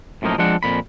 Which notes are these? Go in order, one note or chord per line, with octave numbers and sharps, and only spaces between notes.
F#2 A2 F3 A#3 D#4
F3 G#3 C4 D4 F#5
F2 A#2 B5